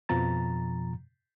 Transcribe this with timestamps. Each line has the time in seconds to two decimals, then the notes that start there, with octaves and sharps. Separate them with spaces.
0.09 F2 B2 F3 A#5 A6